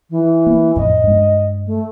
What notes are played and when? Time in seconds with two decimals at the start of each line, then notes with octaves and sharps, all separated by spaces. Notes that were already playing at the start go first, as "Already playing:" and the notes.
0.10 E3
0.47 A#3
0.76 F2 A2 D#5
1.04 G2 G#3
1.66 A3